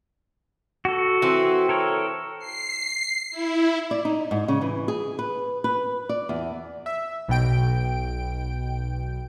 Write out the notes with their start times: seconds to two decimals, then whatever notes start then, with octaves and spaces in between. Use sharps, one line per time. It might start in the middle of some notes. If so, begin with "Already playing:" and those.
0.85 F#4 A4
1.22 E3 C4
1.69 A4 A#4 C#5
2.39 C7
3.31 E4
3.91 D5
4.05 D#4
4.31 G#2
4.48 C#3
4.61 E3
4.88 G#4
5.19 B4
5.64 B4
6.09 D5
6.29 E2
6.86 E5
7.28 B1 B2 G5 D7